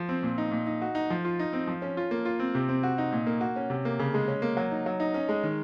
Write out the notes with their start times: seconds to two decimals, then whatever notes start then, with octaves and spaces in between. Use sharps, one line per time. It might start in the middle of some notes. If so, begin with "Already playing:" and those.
Already playing: F3
0.09 C4
0.23 A#2
0.38 D#4
0.52 A#2
0.67 D#4
0.82 F#4
0.95 D#4
1.10 F3
1.25 F4
1.39 D#4
1.53 C4
1.67 F3
1.82 C#4
1.97 F4
2.11 A#3
2.25 F4
2.39 C4
2.55 C3
2.69 C4
2.83 F#4
2.98 D#4
3.12 A#2
3.27 A#3
3.41 F#4
3.56 C#4
3.70 C3
3.85 A#3
3.99 C#3
4.14 G#3
4.28 C#4
4.42 A#3
4.57 F#3
4.71 D#4
4.86 F#3
5.00 D#4
5.14 C#4
5.29 G#3
5.43 D#3